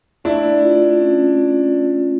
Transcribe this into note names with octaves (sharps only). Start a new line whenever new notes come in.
A3 D4 E4
F4
C#4